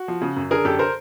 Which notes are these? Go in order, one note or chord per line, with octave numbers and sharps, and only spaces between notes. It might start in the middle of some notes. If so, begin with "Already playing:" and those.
Already playing: F#4
F3
C#3
F#2
D3 G#4 A#4
F#2 G4 A4
A#4 C5